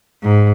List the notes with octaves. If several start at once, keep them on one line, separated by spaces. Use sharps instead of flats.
G#2